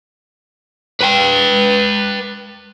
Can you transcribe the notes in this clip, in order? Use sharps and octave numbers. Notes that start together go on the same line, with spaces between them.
B4 G5